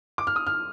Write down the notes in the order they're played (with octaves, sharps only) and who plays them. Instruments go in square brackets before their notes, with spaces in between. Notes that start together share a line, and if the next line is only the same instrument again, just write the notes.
[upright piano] D6
F6
D#6
F6